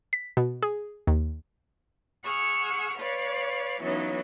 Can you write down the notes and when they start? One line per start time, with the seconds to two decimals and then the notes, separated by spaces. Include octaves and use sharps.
0.13 B6
0.37 B2
0.63 G#4
1.07 D#2
2.24 G#4 F#5 C#6 E6 F6
2.98 B4 C#5 D5 F5
3.81 E3 F#3 B3 C#4 D#4 F4